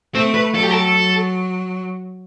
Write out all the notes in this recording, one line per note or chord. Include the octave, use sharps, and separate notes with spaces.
A3 C4
B4
F#3 A4
G4
A4
F#3